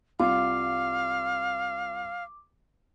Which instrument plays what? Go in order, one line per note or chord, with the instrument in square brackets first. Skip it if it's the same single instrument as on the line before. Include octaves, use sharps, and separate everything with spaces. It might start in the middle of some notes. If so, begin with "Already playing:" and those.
[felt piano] C2 F4 [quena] F5 [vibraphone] D6